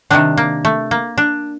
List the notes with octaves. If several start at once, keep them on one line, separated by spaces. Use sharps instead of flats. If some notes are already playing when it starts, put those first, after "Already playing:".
C3 D#3 G3 D4
A#3
A3
A#3
D4